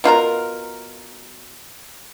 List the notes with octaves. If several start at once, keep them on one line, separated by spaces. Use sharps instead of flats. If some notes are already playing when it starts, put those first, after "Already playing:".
B2 F4 A#4 A#5